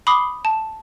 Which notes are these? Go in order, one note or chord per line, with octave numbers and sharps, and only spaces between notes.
B5 D6 D#6 C7 G7
A5